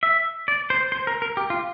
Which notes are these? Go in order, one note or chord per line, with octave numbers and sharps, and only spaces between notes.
E5
D5
C5
C5
A#4
A#4
G4
F4